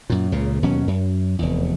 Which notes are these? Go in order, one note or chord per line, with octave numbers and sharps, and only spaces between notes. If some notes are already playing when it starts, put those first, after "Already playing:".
F#2 A#2
C#2 A#2 C#3
D#2 B2 F#3 C#4
F#2
F1 E2